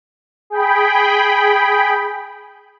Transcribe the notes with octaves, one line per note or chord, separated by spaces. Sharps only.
G#4 G5 B5